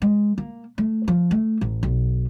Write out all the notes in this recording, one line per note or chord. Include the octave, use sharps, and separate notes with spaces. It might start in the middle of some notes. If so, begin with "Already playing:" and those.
G#3
A#3
A3
F3
A3
A1
B1